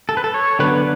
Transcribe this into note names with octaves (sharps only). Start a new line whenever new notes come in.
A4
B4
A4
C#5
D3 F#3 B3 D4 B4